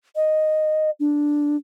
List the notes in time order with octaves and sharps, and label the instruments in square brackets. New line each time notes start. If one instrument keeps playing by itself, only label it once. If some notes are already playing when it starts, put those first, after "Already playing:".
[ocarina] D#5
D4